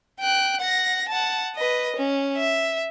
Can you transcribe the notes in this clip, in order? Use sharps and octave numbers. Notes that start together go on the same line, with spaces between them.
G5 F#6
F#5 A#6
F#5 A5
B4 D#5
C#4
E5